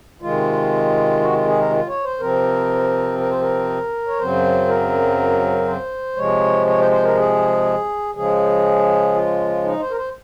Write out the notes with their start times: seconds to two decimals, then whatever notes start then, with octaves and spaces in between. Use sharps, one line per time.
0.22 C3 D#3 G#3 F4
1.21 F#4
1.33 F4
1.46 G#4
1.58 A#4
1.70 F4
1.87 C#5
2.04 C5
2.20 C3 F3 C4 A#4
3.19 A#4
3.30 C5
3.41 A#4
4.07 C#5
4.18 F#2 C#3 F#3 C4 C5
4.68 A#4
5.67 C5
6.17 C3 F3 G#3 C#5
6.67 C#5
6.79 C5
6.91 C5
7.03 A#4
7.16 G#4
8.15 C#3 F3 G#3 G#4
9.14 F4
9.64 D#4
9.80 C5
9.91 A#4
9.96 C5